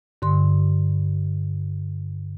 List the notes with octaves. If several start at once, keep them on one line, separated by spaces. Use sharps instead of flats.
G2 D3 C6